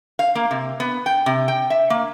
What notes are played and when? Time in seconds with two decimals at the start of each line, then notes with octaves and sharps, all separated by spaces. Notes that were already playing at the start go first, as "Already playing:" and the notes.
0.19 F5
0.35 A#3
0.51 C3
0.80 B3
1.06 G5
1.26 C3
1.48 G5
1.70 E5
1.90 A#3